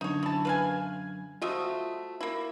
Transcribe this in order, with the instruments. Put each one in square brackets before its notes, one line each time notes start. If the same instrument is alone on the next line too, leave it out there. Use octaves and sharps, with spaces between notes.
[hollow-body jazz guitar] F#2 D3 [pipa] D#4 C#5
[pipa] E4 A5
B4 F5 G#5
[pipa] A3 D#5 E5 [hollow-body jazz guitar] F4 F#4 C5
[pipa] A#3 E4